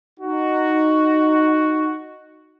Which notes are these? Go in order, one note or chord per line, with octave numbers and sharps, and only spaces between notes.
D#4 F#4